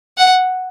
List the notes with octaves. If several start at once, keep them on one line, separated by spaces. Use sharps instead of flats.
F#5